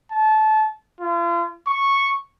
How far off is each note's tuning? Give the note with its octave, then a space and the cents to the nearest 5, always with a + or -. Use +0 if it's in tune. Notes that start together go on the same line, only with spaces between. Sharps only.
A5 -25
F4 -40
C#6 -5